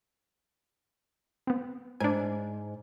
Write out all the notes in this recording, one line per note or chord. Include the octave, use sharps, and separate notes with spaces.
B3 C4
G#2 D4 G#5